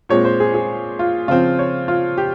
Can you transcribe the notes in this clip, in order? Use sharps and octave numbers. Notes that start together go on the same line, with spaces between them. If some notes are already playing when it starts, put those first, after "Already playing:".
A#2 G#3 C4 C#5
C5
G#4
G#4
F4
C#3 F3 C4 F4
C#5
F4
G4